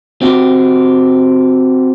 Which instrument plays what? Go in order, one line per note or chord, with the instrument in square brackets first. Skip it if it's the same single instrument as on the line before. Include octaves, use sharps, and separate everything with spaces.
[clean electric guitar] C4 F#4 G4